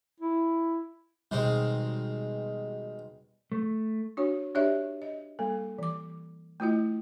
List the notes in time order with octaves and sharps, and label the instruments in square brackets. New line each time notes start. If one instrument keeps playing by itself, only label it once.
[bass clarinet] E4
[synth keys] B2 G3 [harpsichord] D#3 G#3 C4
[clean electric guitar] A3
[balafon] D4 F#4 C#5
D4 G4 C#5 D5 E5
D#5
G3 A#3 A4
E3 D6
A3 E4 F4 D#5